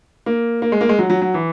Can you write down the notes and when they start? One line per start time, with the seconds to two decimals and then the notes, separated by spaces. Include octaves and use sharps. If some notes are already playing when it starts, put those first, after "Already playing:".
0.26 A#3
0.62 A#3
0.72 G#3
0.81 A#3
0.89 G#3
0.99 F#3
1.10 F#3
1.22 F#3
1.34 E3